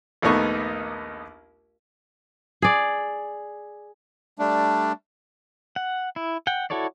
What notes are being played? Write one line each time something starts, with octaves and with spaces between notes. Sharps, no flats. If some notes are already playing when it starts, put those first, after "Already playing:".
A#1 D#2 A3 B3 D#4 C#6
G#4 D5
G3 A3 D4
F#5
E4
F#5 G5
E4 F#4 A4 C#5 D5